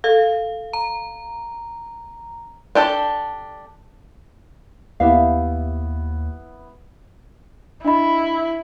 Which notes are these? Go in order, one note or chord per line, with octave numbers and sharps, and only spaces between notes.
A4 F5
A#5
D4 G4 A4 D5
D#2 B3 E4 G4 E5 F5
D4 E4 D#5 B5